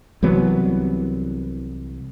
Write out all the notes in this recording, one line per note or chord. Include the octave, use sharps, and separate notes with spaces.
C2 E3 F#3 B3